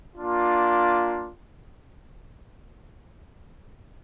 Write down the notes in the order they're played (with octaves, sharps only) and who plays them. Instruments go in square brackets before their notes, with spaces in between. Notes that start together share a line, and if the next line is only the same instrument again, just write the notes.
[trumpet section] A#3 D4 F4